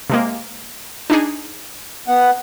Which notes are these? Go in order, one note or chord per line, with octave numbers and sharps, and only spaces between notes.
C3 G#3 A#3
D4 D#4 G#4
B3 F#5